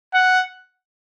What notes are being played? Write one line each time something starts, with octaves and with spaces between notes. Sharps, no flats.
F#5